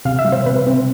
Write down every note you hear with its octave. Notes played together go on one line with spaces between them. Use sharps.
C3 F5
E5
G3
C5
C3 B4
C4